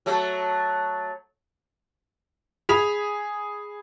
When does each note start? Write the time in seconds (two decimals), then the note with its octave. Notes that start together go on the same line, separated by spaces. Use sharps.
0.06 F#3 A3 A4
2.69 G#4 B5 B6 F7